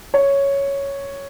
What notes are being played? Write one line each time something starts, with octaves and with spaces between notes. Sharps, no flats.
C#5